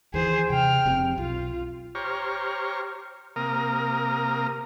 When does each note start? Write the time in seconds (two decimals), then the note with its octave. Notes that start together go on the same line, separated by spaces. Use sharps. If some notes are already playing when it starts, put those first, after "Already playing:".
0.14 D#2 E3 G#4 C5
0.50 C3 G5 F6
0.85 F1 C3 C4
1.18 B1 F4
1.95 G4 C5 C#5 A#5 C#6 F6
3.36 C3 A#3 A#4 A#5 D#6